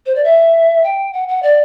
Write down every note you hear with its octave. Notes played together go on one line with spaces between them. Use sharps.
C5
D5
E5
G5
F#5
F#5
D5